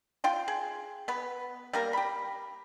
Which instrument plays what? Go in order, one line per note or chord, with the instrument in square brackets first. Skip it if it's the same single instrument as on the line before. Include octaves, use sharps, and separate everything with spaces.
[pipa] F4 G5 C6
G#4
B3 B4
G3 A#3 A#4
G4 B5